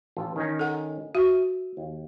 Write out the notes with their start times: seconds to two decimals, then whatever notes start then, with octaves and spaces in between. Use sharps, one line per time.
0.17 A1 F4 A4
0.36 D#3 C#4 D#4
0.59 A4 F#5
1.15 F#4 E5
1.77 D#2